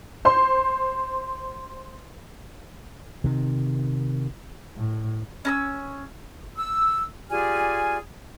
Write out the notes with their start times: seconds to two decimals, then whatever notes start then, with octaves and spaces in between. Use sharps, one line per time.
0.25 C5 C6
3.24 C3 D#3
4.76 A2
5.45 C#4 A#5 E6
6.58 E6
7.30 F4 G4 G#4 D5 G#5 F6